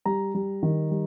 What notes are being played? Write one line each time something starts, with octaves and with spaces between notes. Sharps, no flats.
G3 A#5
G3
D#3
G3